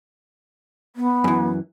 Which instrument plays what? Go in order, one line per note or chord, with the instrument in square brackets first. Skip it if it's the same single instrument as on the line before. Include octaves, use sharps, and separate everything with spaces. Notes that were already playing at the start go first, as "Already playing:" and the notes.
[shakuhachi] B3
[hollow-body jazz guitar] F#2 E3